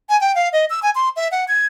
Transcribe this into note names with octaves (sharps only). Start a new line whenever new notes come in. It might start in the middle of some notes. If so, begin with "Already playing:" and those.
G#5
G5
F5
D#5
E6
G#5
C6
E5
F#5
G#6